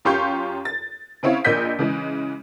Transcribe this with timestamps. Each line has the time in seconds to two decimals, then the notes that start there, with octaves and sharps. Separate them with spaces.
0.05 F#2 F4 G4 C6 C#6 G6
0.65 A6
1.23 C#3 C4 E4 C#5 F5
1.44 A#1 A#2 A#3 D#5 G6 B6
1.79 C#3 E3 G#3